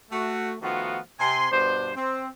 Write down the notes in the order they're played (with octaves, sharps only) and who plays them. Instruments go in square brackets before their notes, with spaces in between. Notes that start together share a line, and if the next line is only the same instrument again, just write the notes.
[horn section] A3 F#4
D#3 F3 A3 B3 F4 F#4
C3 G#5 C6
G2 B2 D4 C5
C4